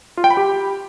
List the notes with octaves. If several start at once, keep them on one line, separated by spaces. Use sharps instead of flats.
F4
G5
B5
G4